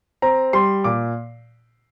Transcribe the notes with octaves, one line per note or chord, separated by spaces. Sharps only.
C4 A#5
G3 C6
A#2 D6